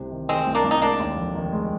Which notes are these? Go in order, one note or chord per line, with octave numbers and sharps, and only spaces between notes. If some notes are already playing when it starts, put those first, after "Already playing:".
Already playing: C2 C3
D#3
D#3 G#3 C4
C2
A#3 D4
C2
D#4
G#3 A#3 D4
D#2
F1
D#3
G#3